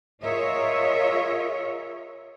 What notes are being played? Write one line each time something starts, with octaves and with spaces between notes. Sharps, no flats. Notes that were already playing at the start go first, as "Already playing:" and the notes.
F4 G#4 A#4 C#5 D#5 E5